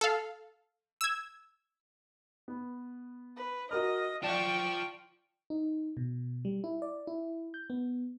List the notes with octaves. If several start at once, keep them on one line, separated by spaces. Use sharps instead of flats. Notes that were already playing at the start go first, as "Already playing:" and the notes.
A4 F5
E6 G#6
B3
B4
F#4 A#4 D#5 F6
F4 D5 G5 A5 C#6
D#4
B2
G3
E4
D5
E4
G6
B3